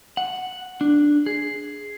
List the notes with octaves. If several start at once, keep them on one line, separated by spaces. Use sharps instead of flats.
F#5
D4
G#4